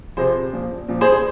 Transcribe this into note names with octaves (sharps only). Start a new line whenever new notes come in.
C3 F3 G#4 C5
A#2 F3
A#2 F3
G#4 C5
G#4 C5